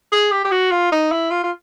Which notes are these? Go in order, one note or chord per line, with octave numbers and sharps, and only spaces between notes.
G#4
G4
G4
F#4
F4
D#4
E4
F4
F4